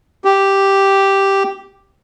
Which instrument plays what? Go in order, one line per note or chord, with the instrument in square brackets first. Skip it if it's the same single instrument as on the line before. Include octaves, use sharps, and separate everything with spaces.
[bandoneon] G4